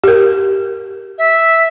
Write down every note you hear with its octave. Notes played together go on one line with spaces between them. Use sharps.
G4 A#4
E5